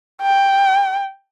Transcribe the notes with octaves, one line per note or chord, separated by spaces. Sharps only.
G5